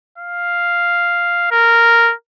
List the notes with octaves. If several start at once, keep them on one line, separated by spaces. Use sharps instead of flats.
F5
A#4